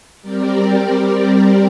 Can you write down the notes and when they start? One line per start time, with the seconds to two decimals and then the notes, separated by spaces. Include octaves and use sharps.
0.22 G3 C4 G4 A#4 D5